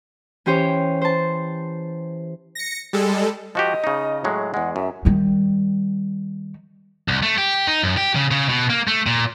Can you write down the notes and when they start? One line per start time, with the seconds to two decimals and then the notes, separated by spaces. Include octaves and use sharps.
0.46 E3 C#4 G4 C5 C#5
1.01 C5 A5
2.55 A#6 C#7
2.93 G3 G#3 A4
3.55 F3 F#4 G4 D#5
3.84 C#3 D#4
4.24 A2 F#3 G#3
4.54 E2 G#3 F#5
4.76 F#2 E5
5.05 D#3 G3
7.08 C2
7.23 A3
7.38 G4
7.67 D#4
7.83 F#2
7.97 G4
8.15 C#3
8.31 C#3
8.49 B2
8.70 A#3
8.88 A3
9.06 A#2